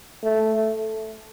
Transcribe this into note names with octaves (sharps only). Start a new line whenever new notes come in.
A3